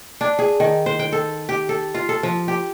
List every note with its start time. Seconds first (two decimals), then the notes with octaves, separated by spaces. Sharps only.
0.21 D4
0.39 G#4
0.60 D#3
0.86 C5
0.99 G5
1.12 A4
1.49 G4
1.69 A4
1.95 F4
2.09 A4
2.23 F3
2.48 G4